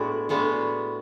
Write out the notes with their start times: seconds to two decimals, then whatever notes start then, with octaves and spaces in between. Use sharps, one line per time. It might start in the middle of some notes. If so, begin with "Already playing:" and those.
Already playing: A2 G#3 B3 D4 F#4
0.29 A2 G#3 B3 D4 F#4